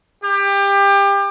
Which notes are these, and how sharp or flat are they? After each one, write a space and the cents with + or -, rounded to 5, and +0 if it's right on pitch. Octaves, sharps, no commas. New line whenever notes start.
G4 +25